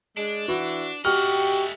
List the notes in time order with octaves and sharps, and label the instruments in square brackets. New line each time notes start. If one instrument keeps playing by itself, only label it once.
[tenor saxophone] G#3 [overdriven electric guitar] D4
[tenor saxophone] E3 [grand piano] F#4
[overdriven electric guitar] A3 D#5 [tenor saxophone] F#4 [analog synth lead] G4 [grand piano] F6